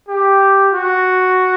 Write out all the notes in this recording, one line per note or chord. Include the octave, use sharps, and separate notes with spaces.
G4
F#4